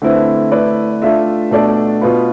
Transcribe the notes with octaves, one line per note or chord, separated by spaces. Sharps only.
D3 A3 C4 E4 B4
A3 E4 B4 D5
A3 D4 F4 A4 E5
B2 A3 D4 A4 D5
B2 B3 F4 B4